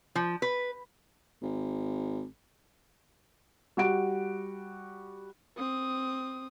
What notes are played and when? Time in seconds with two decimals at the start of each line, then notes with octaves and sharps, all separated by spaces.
0.15 F3
0.42 B4
1.42 G#1
3.77 G3 F#4 D7
5.56 C4 D#6